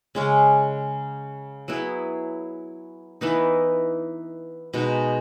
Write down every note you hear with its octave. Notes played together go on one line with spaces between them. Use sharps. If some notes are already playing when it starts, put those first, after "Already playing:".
C#3 G#3 C#4
F#3 B3 E4 G#4
E3 B3 D#4
B2 G#3 D#4